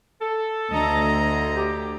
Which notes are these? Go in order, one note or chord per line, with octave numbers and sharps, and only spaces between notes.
A4
D2 D#5 A#5
G4